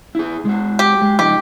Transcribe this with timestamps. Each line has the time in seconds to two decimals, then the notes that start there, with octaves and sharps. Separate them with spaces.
0.15 E4 G#4
0.45 G#3 F#4
0.79 G4
1.02 G#3
1.19 F3 D#4 G4 D#5